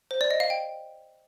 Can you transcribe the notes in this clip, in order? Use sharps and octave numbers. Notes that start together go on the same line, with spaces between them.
C5
D5
D#5
F5
G5